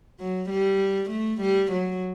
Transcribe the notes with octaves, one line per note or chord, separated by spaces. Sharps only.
F#3
G3
A3
G3
F#3